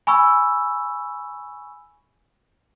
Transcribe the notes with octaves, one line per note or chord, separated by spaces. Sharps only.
G#5 B5 C#6 E6